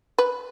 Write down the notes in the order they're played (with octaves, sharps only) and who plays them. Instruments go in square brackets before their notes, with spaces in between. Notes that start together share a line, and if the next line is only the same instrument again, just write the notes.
[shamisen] B4